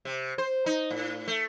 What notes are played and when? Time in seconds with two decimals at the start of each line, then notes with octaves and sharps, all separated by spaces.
0.05 C3
0.38 C5
0.66 D#4
0.90 A2
1.28 A3